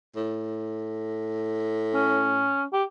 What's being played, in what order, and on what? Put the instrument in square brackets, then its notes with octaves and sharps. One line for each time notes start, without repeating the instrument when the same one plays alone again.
[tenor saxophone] A2
[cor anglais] C#4
G4